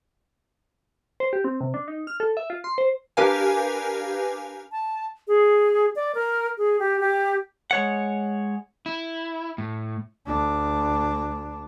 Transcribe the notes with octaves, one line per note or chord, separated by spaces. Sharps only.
C5
G4
C4
C3
D4
D#4
F6
A4
E5
F4
C6
C5
D4 G4 A#4 B4 F5 G#5
A5
G#4
D5
A#4
G#4
G4
G4
G#3 C#5 F#5
E4
A2
D2 D4